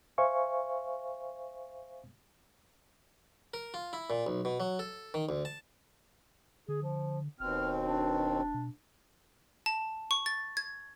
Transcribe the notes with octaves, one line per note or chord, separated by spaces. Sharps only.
C5 E5 F5 G#5 C#6
A#4
F4
E4
A#2
B1
B2
F#3
A4
D#3
D2
A5
D3 G#4
F3
E1 D#2 B2 C4 F6
D4
B2
A5
C#6
A6
G#6